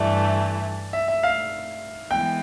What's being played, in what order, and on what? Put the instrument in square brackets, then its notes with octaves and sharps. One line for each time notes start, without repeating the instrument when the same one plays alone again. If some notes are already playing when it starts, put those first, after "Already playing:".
Already playing: [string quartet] G2 E3 A3 [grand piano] D5
[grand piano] E5
E5
F5
[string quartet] E3 G#3 B3 [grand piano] G5